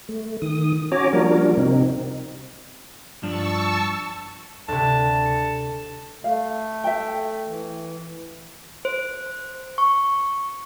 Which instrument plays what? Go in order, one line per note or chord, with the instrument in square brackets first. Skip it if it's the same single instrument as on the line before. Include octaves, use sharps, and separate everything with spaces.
[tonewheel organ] A3
D#3 D#6
C#4 F#4 C#5 G#5 A#5 D6
F3 G3 A#3 D4 F#4 A#4
C3 C4 D#4
[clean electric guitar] G2 F3 D4 [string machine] A5 C#6 E6
[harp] D2 C3 [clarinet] A5
[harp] C#7
[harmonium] A3 [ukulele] F5
[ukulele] E5 G5
[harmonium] E3
[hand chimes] C5
C#6